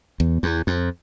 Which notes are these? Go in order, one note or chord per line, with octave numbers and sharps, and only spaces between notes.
E2
E2
F2